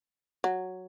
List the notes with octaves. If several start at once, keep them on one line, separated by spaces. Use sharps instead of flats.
F#3